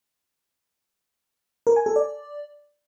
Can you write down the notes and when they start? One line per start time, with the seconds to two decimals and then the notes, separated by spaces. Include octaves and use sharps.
1.67 A#4
1.76 G#5
1.86 A4
1.96 D5